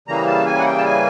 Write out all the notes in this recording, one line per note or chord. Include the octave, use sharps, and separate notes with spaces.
C#3 E3 G3 A#3 A#5
A5
G#5
F#5
G5
A5
G#5